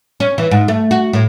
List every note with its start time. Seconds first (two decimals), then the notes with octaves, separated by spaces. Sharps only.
0.20 C#4
0.38 E3
0.51 G#2
0.68 A3
0.91 F#4
1.13 A2